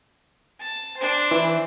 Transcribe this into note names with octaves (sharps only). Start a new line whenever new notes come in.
A5
D4 C5
E3